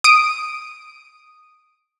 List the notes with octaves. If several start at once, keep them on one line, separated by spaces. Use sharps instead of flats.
D#6 D7